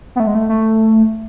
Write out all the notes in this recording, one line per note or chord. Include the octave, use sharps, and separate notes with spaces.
B3
A3
G#3
A3
A3